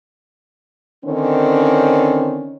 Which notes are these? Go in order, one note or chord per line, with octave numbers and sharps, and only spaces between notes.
D3 D#3 C4 C#4